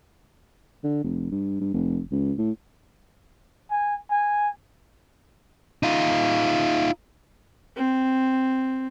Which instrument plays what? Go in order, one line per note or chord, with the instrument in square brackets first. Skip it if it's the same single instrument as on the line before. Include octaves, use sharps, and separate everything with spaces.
[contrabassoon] D3
F1
G2
G2
F1
C#2
A2
[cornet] G#5
G#5
[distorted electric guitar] D#4 F4
[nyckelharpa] C4